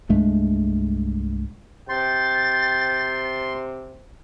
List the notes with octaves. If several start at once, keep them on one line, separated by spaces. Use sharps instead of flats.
C2 G2 G#3 A3
C3 G5 C6 A6